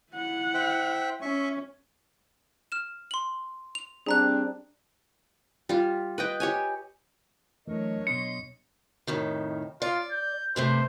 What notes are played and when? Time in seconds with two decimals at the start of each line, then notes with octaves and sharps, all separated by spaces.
0.13 E4 F#5
0.54 C5 E5 G5
1.22 C#4 E5 C#6
2.72 F6 E7
3.11 C6 F#7
3.75 F7
4.06 G3 C4 D4 G#4 A#5 F#6
5.69 G3 F4
6.18 B4 D#5 G5
6.40 G4 C#5 G#5
7.68 E3 F#3 A3 D4 A#4 C#5 D#5
8.07 B2 B3 D4 D#5 C6 C#7
9.07 F2 A2 D#3
9.82 F4 D5
10.11 G6
10.56 G2 C3 A3 C5